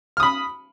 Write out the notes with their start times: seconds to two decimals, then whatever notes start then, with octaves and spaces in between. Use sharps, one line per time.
0.17 F6
0.20 D#6
0.23 B5